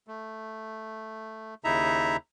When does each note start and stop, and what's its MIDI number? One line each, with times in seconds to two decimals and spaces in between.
0.07 1.54 57
1.64 2.17 39
1.64 2.17 49
1.64 2.17 63
1.64 2.17 64
1.64 2.17 76
1.64 2.17 82